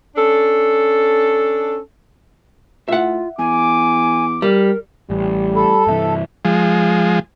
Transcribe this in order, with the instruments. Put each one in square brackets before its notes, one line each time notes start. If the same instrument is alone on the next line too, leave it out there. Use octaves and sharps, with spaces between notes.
[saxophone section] C#4 D4 A4
[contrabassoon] A2 [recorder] F4 [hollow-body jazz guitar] E5 F#5
[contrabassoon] E2 [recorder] G#5 [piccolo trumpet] D6
[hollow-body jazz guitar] G3 [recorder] A#4
[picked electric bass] A1 [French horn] G3
[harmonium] A4 [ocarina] B5
[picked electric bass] G2 C3 E3 [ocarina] E5
[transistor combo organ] F3 G#3